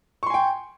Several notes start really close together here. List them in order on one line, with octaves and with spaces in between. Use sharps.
C#6 C6 G#5 G5